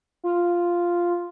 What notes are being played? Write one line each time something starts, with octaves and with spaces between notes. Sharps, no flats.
F4